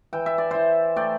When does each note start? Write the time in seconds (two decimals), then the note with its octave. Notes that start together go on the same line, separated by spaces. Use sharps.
0.13 E3 G5
0.26 E5
0.38 D5
0.51 E4 C5 E5
0.96 A3 D5 G5